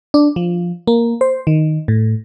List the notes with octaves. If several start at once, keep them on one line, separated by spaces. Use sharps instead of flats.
D4
F3
A#3
C5
D#3
A2